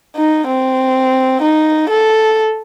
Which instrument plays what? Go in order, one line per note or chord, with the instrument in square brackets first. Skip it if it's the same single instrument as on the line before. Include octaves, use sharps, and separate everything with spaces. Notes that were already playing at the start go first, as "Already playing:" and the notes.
[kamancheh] D#4
C4
D#4
A4